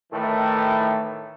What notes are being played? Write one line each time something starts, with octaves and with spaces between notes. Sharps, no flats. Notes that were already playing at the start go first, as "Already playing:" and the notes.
A2 D#3 E3 A3